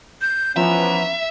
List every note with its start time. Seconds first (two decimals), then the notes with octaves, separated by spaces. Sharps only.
0.21 G6
0.56 E3 F3 B3 C#4 E5 A#5